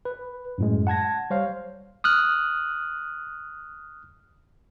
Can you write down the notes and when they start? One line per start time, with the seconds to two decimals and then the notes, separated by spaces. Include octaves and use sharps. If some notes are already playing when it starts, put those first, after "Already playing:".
0.05 B4
0.58 F#2 A2 G#3
0.87 F#5 A5 G#6 A#6
1.30 G3 C5 C#5 F5
2.04 D#6 F6 F#6